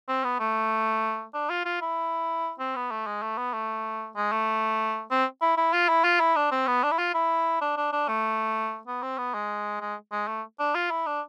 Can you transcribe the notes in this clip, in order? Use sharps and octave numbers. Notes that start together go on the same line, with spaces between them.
C4
B3
A3
D4
F4
F4
E4
C4
B3
A3
G#3
A3
B3
A3
G#3
A3
C4
E4
E4
F4
E4
F4
E4
D4
C4
B3
D4
E4
F4
E4
D4
D4
D4
A3
B3
C4
B3
G#3
G#3
G#3
A3
D4
F4
E4
D4